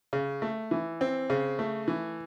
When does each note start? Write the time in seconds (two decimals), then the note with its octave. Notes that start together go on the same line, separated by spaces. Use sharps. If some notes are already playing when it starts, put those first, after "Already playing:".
0.13 C#3
0.42 A3
0.71 E3
1.01 C4
1.30 C#3
1.59 A3
1.88 E3